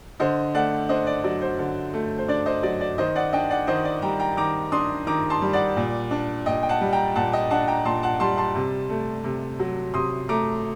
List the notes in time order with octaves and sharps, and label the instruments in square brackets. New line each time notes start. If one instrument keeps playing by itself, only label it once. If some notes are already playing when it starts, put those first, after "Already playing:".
[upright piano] D3 C5 D#5
A3 D5 F#5
D4 C5 D#5
D5
F#3 D5
C5
D3
A3
C5
D4 D5
C5 D#5
F#3 D5
D5
D#3 C5 D#5
D5 F#5
D4 D#5 G5
D5 F#5
D#3 C5 D#5
D5
G3 G5 A#5
G5 A#5
D#3 A#5 D6
D4 C6 D#6
D#3 A#5 D6
A5 C6
G3
D5 F#5
A#2
D4
A#2 D#5 G5
G5
F#5 A5
G3
G5 A#5
A#2 F#5 A5
D#5 G5
D4 F#5 A5
G5 A#5
A#2 A5 C6
F#5 A5
G3 A5 C6
A5 C6
C3
A3
C3
F#3
C3 C6 D#6
A3 A#5 D6